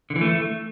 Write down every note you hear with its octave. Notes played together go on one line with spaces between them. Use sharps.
D3
E3
A3